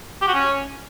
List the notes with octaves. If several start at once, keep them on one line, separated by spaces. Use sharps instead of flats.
G4
F#4
C#4